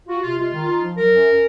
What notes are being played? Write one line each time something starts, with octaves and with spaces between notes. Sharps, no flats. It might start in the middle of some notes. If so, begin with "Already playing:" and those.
F4 F#4
C3 F4
G#3 F4
D#3
D#4
F3
F#3 A#4
F#2
C#4